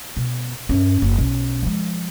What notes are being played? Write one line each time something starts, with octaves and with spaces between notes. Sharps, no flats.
B2
G2 C#4
F#1
B1 C#4
F3 G#3